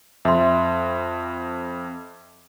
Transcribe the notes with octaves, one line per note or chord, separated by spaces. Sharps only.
F2 E5 C6